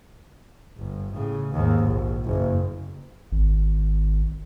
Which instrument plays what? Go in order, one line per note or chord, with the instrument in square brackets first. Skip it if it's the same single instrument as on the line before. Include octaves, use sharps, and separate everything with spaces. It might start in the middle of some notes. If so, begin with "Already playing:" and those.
[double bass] G1
A2 C#3
D#2 G#2
A#1
F#1
[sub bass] G#1